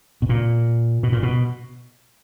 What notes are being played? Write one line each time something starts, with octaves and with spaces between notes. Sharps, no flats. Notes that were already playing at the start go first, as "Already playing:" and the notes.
B2
A#2
B2
A#2
B2